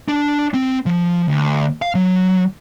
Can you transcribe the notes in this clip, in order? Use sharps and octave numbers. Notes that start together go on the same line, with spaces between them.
D4
C4
F3
D2
F5
F#3